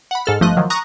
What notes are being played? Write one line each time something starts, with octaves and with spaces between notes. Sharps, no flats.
F#5 B5
G#2 A4 F6
G1 F3 A3 D#5 F#6
D#3 F3 F#3
A#5 C#6 D#6 F#6 A#6